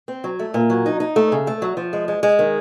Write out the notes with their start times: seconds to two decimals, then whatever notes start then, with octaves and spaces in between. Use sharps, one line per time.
0.08 C4
0.24 F#3
0.39 A3
0.54 A#2
0.70 F#3
0.86 D#4
1.00 D#4
1.16 A3
1.32 C#3
1.47 A3
1.62 F#3
1.77 F3
1.93 G#3
2.08 G#3
2.23 G#3
2.39 D#3